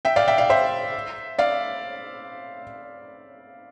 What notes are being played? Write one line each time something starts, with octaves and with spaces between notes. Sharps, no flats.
E5 G5
D5 F5
E5 G5
D5 F5
C5 E5
D5 F5